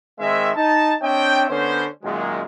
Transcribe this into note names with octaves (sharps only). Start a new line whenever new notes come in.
D#3 G#3 C4 E5
D#4 A5
C4 D4 C#5 D#5 E5 G5
D3 B3 C#4 C5
F#2 A#2 D#3 F#3 G#3